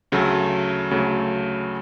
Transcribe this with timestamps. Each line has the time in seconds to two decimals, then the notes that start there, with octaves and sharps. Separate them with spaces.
0.12 D2 C#3 F#3 A3
0.91 D2 C#3 F#3 A3